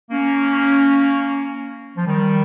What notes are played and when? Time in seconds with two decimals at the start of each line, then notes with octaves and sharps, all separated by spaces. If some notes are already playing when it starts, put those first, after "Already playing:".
0.11 A#3 C#4
1.97 F3
2.06 D#3 G3